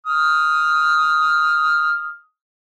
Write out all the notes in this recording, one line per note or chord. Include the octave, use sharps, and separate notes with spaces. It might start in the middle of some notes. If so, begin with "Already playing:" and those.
D#6 F6